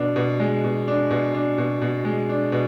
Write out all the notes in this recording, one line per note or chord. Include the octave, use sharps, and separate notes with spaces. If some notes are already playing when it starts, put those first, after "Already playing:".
Already playing: B2 D4
B2
G#3
B2
D4
B2
D4
B2
B2
G#3
D4
B2